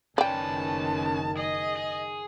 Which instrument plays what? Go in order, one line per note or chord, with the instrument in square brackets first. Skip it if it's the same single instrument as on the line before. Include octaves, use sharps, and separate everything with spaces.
[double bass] F#1 D#3 [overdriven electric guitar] C#4 B4 [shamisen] D5 G5 [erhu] A5
[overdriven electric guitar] G#4 [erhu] D#5
[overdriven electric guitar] G#4